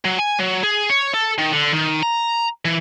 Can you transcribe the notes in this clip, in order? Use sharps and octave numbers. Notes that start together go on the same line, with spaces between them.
F#3
G#5
F#3
G#4
C#5
A4
D#3
D3
D#3
A#5
E3